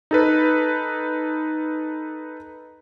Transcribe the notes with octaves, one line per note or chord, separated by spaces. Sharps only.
D#4 A4 B4